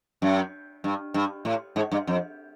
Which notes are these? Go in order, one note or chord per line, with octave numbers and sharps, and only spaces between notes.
F#2
G2
G2
A2
G#2
G2
F2